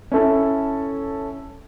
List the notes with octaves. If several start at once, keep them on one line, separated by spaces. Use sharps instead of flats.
C#4 E4 A4